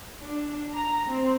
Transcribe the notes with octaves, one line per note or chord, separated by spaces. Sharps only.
D4
A#5
C4